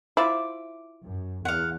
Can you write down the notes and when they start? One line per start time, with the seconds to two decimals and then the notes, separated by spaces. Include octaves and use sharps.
0.17 E4 F4 C5 E5 D6
1.03 F#2
1.45 E2 F5 F#5